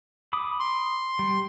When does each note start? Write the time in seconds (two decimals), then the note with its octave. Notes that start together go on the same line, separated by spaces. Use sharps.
0.33 B5 D6 D#6
0.60 C6
1.19 G3